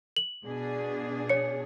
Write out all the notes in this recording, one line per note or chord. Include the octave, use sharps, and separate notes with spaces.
F#7
B2 D4 G#4
C#5 C#7